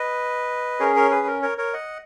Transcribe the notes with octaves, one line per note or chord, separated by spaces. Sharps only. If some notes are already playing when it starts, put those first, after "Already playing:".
Already playing: B4 D#5
C#4 G#4 A#4 C#5
A#4 C#5
G#4 B4
A#4
A#4 C#5
A#4 C#5
D#5 F#5